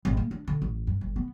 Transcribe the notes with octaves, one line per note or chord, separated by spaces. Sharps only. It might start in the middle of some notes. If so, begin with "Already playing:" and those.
G#1
A#3
D4
D3
A1
G2
G1
B3